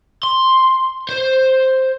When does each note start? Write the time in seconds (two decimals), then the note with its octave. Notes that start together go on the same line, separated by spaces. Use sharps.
0.23 C6
1.09 C5